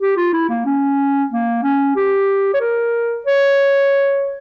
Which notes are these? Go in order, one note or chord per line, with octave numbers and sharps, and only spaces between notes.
G4
F4
E4
A#3
C#4
A#3
C#4
G4
C#5
A#4
C#5